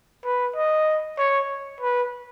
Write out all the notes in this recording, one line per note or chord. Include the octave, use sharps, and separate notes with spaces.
B4
D#5
C#5
B4